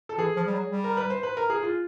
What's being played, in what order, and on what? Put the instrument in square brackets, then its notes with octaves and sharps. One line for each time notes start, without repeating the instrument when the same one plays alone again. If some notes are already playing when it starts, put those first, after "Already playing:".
[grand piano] A4
[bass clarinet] E3 [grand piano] G#4
[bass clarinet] F3
G3
F#3
G3
[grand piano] A#4
B4
C5
B4
A#4
G#4
F4